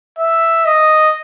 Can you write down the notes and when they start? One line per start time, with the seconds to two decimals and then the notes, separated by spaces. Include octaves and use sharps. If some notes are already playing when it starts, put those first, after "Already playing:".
0.18 E5
0.65 D#5